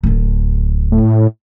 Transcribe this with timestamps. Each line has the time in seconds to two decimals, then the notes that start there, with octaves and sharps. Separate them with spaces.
0.04 D1 D3
0.92 A2